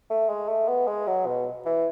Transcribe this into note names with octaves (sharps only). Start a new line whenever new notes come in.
A3
G#3
A3
B3
G#3
F#3
B2
E3